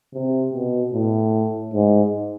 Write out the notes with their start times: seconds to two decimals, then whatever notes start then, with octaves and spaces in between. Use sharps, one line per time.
0.14 C3
0.54 B2
0.93 A2
1.74 G#2